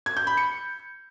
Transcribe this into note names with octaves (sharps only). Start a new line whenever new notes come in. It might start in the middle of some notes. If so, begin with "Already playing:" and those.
G#6
G6
B5
C#7